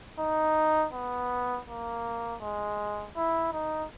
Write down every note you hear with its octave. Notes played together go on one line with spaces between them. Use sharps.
D#4
B3
A#3
G#3
E4
D#4